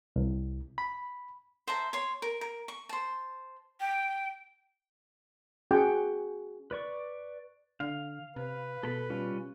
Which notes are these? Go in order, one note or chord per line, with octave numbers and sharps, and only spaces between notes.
C2
B5
C5 E5 A5 A#5
C#5 C6
A#4
A#4
C#6
C5 A5
G5
C#4 F#4 G#4 F#5 G5 D6
B4 D5 C#6
D3 F5
C3 B4
B2 A4 B5
G3 C#4 F4